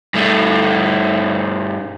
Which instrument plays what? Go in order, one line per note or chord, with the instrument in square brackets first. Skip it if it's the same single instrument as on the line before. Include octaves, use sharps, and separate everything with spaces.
[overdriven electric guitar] G2 A3